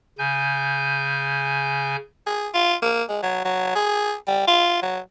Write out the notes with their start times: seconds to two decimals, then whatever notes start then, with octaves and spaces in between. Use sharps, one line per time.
0.18 C#3 G#5 G6
2.27 G#4
2.54 F4
2.82 A#3
3.09 G#3
3.23 F#3
3.45 F#3
3.76 G#4
4.27 G3
4.47 F4
4.82 F#3